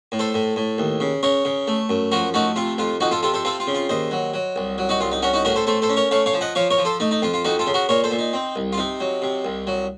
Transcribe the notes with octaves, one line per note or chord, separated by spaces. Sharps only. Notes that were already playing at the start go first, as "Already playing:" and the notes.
A2
A4 C5
A2
A2
D#2
C#3
C#3 A#4 C#5
C#3
A3
F#2
F3 F#4 A#4
A3 D#4 F#4
C3 F4
F2 F4
F2 D#4 F#4
F4 A4
C3 F4 A4
A4 C5
C4 F4 A4
F4
C#3
F4
D#2 C5 D#5
F#3
F#3
C2
F#3
D#4 F#4
C2 F4
D#4
C#4 F#4 A#4
D#4 F#4
A2 F#4 A#4
A4 C5
A3 A4 C5
A4 C5
C#4
A#4 C#5
A3 C#5 F5
C#5 F5
F3
D#5 F#5
F3 C#5 F5
A#4 C#5
F3
A4 C5
A3 D#4
D#4
F2 F4
F4
F2 D#4 F#4
F4 A4
C#3
F#4 A#4
A#2 A#4 C#5
A4 C5
A#2
D#4
C4
C2
F4
C3 D#4
F#3
C3
C2
F#3